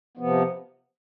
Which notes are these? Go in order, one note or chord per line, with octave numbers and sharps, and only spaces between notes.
C3 F3 B3